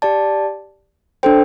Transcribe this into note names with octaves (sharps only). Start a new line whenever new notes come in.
G4 D5 A5
D4 A4 C5 G5